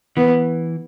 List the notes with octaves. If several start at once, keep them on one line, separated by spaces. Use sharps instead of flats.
E3 B3